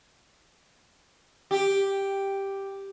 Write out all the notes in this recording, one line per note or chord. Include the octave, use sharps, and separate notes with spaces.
G4